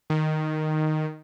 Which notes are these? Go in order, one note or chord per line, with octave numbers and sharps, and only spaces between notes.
D#3